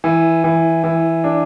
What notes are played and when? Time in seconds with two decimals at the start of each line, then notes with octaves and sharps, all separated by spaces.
0.04 E3
0.44 E3
0.84 E3
1.24 D4